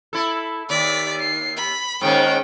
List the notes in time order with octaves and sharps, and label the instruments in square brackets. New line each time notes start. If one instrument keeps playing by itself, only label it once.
[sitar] E4 A4
[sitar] D#2 [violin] D5 B6
[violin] C7
B5
[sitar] G#2 D#3 A#3 [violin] C#4 G5